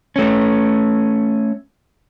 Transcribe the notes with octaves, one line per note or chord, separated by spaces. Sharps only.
A3 C#4